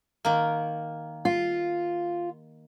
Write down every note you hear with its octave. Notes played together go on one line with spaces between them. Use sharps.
D#3 A#3
F4